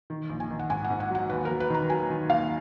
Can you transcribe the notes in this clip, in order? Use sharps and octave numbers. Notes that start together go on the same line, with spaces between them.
D#3
A#1
G#5
D#3
F#5
G#2 G#5
F#5
G#2
F#5
F#3 F#5
D#2 B4
F#3 A#4
B4
D#3 A#5
F#3 G#5
D#3
D#2 F5